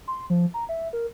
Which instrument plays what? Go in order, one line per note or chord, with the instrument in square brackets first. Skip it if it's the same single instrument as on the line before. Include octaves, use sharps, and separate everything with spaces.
[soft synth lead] C6
F3
A#5
E5
A#4